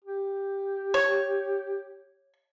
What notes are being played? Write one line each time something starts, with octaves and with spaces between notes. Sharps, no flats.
G4
C#5